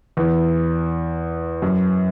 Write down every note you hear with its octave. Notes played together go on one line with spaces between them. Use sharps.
E2
F#2